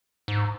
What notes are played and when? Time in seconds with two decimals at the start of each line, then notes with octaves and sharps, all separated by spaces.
0.28 G#2